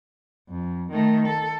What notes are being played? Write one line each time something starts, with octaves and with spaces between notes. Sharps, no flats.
F2
D#3 A3
A4